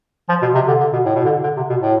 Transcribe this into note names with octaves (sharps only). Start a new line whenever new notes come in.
F3
B2
C3
D3
D3
B2
A2
B2
D3
D3
C3
B2
A2